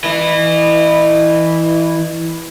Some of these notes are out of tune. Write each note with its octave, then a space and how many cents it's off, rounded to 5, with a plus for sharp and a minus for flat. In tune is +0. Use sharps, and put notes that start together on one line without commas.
E3 -5 D#5 -35